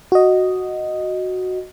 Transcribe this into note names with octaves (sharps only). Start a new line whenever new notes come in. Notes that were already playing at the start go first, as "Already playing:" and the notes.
F#4 D#5